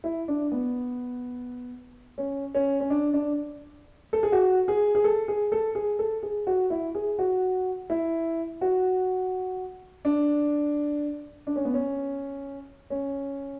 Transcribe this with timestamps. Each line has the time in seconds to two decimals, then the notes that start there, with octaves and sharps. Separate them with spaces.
0.04 E4
0.28 D4
0.52 B3
2.18 C#4
2.55 C#4
2.80 C#4
2.90 D4
3.14 D4
4.13 A4
4.23 G#4
4.32 F#4
4.68 G#4
4.95 G#4
5.04 A4
5.28 G#4
5.52 A4
5.75 G#4
5.99 A4
6.23 G#4
6.47 F#4
6.70 E4
6.95 G#4
7.19 F#4
7.90 E4
8.61 F#4
10.05 D4
11.47 D4
11.56 C#4
11.65 B3
11.74 C#4
12.90 C#4